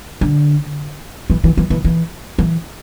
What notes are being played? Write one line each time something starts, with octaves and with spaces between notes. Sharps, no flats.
D3
E3
E3
E3
E3
E3
E3